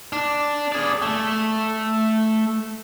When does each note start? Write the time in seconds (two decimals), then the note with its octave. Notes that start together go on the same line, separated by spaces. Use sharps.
0.13 D4
0.72 G#4 D5
1.02 A3